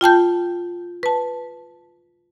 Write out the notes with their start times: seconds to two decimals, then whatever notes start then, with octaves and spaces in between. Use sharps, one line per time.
0.01 F4 G5 A5 G6
1.03 B4 A5